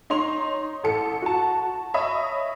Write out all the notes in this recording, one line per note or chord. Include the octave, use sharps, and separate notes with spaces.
D#4 C#5 C6 F7
A1 A4 C#7
F#4 A5
C#5 D#5 E5 B5 D#6